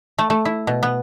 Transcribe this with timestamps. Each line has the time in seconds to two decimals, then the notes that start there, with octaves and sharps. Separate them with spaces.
0.19 A3
0.30 A3
0.45 E4
0.67 B2
0.83 B3